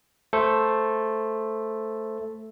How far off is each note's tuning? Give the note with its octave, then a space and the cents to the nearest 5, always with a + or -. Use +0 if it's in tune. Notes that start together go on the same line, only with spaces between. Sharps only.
A3 +0 A4 +0 C5 +0